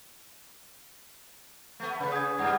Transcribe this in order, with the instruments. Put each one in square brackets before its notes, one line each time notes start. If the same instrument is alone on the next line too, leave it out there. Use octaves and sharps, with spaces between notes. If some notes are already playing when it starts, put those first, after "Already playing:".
[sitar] A3 B3
[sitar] C#3 [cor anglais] B4
[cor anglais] G#4 [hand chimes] D#6 G#6
[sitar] G2 G3